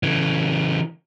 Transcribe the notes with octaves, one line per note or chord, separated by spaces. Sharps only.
C#3 E3